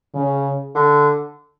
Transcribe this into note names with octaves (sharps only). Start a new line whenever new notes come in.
C#3
D3